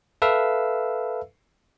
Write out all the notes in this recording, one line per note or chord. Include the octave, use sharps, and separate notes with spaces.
A4 B4 E5 F5 E6